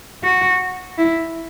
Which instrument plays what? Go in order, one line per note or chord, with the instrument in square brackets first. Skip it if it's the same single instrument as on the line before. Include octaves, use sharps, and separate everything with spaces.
[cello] F#4
E4